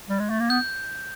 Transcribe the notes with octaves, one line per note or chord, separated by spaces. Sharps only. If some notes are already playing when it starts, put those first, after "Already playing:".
G3
G#3
A3
A#3
B3 G6